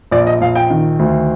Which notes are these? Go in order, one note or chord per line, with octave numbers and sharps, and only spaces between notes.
A#1 D5
D#5
A#1 F5
G5
D#3
D2